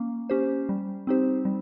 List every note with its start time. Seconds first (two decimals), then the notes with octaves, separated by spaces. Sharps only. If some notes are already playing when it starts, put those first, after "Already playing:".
Already playing: A#3 C#4
0.30 C#4 G4 C5
0.69 G3
1.07 C4 D#4 G4 C5
1.45 G3